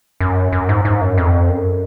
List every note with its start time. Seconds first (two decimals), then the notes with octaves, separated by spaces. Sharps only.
0.20 F#2
0.53 F#2
0.69 G#2
0.85 G#2
1.01 F#2
1.18 F2
1.49 F#2